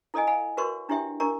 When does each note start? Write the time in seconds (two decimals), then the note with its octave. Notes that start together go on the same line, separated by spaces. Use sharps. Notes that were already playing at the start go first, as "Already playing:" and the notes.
0.14 E4 A4 D5 D#5 G#5
0.27 F5 G#5 B5
0.57 F#4 A#4 B4 C#5 C6 C#6
0.89 D4 E4 G4 C#5 E5 G5
1.20 D4 A#4 D5 A#5 C#6